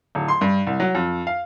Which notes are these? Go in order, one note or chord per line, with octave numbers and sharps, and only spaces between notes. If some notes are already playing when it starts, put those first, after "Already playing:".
D1
C6
G2
C2
F#3
F2
F5